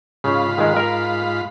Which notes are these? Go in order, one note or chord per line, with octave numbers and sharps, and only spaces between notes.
G#2 C#3 F4 B5
D#3 G#3
A#4